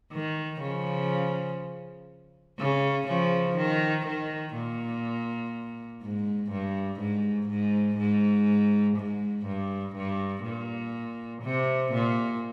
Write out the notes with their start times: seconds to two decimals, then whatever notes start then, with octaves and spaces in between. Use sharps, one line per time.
0.12 D#3
0.61 C#3 F3
2.59 C#3
3.07 C#3 F3
3.57 D#3
4.06 D#3
4.54 A#2
6.02 G#2
6.51 G2
7.00 G#2
7.49 G#2
7.98 G#2
8.97 G#2
9.46 G2
9.96 G2
10.44 A#2
11.43 C3
11.92 A#2